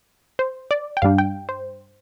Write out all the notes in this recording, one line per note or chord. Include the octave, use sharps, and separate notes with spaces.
C5
D5
G5
G2 G3 D4 F5
G5
C5